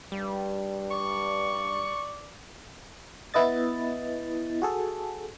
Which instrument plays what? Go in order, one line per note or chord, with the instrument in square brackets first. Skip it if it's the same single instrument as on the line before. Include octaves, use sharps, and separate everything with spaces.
[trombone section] G2 [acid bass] G3
[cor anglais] D5 [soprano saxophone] C#6
[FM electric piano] B3 E4 B4 D#5 A6
F#4 G#4 A4